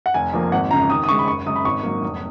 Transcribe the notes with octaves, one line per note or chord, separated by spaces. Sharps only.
F#5
F1 G#5
F2 F3 A#3
G#1 F#5
F#2 C#3 F3 A#5
D#2 D#6
D#6
C#3 G#3 C#6
B5
F#1 C#6
F#2 C#3 G#3 D#6
B5
G#1 C#6
G#2 F#3 A#3
F1